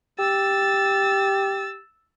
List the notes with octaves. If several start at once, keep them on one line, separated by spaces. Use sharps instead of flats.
G4 E6 A6